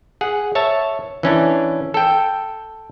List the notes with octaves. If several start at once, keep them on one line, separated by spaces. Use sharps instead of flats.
G#4 F#5
C#5 E5 A5
E3 C#4 D4
A4 G5